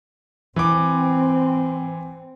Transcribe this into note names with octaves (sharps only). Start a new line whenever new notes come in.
E3 C4 D6